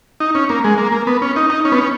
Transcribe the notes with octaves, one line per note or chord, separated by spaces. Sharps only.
D#4
C#4
A#3
G#3
A#3
A#3
B3
C#4
D#4
D#4
C#4
B3
C#4